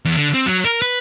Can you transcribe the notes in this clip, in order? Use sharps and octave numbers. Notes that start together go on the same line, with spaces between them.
E2
D3
C4
F#3
A#4
B4